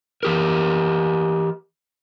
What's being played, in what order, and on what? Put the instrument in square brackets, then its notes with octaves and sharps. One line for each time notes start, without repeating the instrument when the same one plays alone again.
[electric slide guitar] E3 G4 A#4